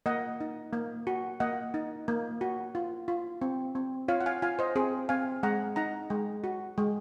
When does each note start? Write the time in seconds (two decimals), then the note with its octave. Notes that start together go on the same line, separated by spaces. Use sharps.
0.06 A#3 D#5 F#5
0.40 D#4
0.73 A#3
1.07 F#4
1.40 A#3 D#5 F#5
1.74 D#4
2.08 A#3
2.41 F#4
2.75 F4
3.08 F4
3.42 C4
3.75 C4
4.08 F4 C#5 F5
4.21 F#5
4.26 F5 G#5
4.42 F4 F5 G#5
4.59 C5 D#5
4.75 C4 G#4 C5
5.09 C4 F5 G#5
5.43 G#3 F#5 A#5
5.76 D#4 F#5 A#5
6.10 G#3
6.44 F#4
6.78 G#3